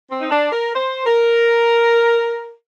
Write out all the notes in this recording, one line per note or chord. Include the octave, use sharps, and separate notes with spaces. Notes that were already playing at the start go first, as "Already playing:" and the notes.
C4
D#4
D4
A#4
C5
A#4